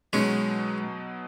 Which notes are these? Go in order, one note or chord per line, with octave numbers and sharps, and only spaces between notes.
B2 F#3 G#3 C#4 D#4